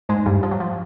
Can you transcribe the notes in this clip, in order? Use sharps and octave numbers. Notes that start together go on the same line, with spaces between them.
G#2 G#3
G2 G3
F3
F#3
F3